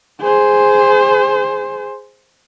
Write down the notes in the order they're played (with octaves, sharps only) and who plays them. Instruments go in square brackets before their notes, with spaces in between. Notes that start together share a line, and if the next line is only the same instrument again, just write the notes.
[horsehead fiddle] G#4 C5